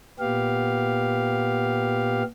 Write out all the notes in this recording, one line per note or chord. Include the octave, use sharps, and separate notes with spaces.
A#2 B3 G4 F5